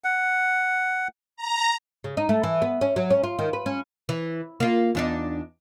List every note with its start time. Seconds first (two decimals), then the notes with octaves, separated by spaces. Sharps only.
0.04 F#5
1.36 A#5
2.04 C#3
2.17 D#4
2.29 A3
2.43 E3
2.62 B3
2.81 C#4
2.96 F#3
3.11 C#4
3.24 F4
3.39 D#3
3.53 B4
3.66 C#4
4.09 E3
4.60 A#3 F4
4.95 E2 D4 D#4